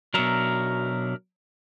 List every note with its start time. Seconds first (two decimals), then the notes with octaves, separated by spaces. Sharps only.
0.14 B2 F#3 D4 A#4 E5